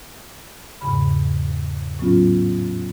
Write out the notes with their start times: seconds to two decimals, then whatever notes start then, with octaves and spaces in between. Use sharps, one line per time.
0.81 E2 G#2 C#3 B5
1.99 A2 F#3 B3 C#4 F4